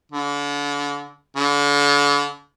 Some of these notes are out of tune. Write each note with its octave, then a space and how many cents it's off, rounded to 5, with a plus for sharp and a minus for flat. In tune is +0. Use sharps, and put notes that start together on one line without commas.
D3 -35
D3 -40